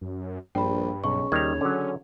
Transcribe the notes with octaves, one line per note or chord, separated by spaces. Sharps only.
F#2
A#1 G2 G5 B5
B1 C#3 C#6
D#2 D#3 G3 G#6 F7
D3 F#3 C#4